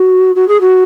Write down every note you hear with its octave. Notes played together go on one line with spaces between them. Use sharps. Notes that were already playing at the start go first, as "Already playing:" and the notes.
Already playing: F#4
F#4
G#4
F#4